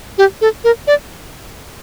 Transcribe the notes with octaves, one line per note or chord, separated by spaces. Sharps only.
G4
A4
A#4
D5